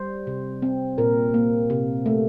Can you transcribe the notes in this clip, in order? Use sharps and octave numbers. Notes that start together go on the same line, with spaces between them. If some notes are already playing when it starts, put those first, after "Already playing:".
Already playing: G3 C5
C3
C4
A#2 A#4
A#3
C3
A3